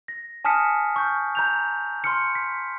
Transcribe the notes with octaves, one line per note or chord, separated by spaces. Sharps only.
A#6
G#5 A5 D#6 F6 B6 C#7
C#6 F6 G6
A#5 G6 F7
B5 C6 F6 C#7
B6